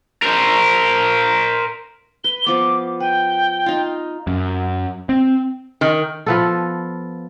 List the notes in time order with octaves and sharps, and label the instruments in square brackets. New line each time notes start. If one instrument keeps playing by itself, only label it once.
[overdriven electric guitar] A#4 C5
[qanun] B4 [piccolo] G7
[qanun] F3 B3 [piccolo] D6
[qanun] B4 [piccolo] G5
[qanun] D#4 F4
[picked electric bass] F#2
C4
[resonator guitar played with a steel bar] D#3
[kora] F3 B3 A4